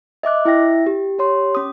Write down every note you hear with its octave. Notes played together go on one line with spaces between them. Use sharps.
D#5 E5 D6 F#6
E4 E5 G5 A#6
G4
G4 C#5 C6
C#4 D#6